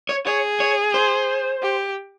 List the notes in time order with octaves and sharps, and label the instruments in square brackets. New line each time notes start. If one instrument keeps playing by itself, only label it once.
[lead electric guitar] C#5
[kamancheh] G#4 [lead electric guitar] C#5
[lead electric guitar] C#5
C5
[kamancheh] G4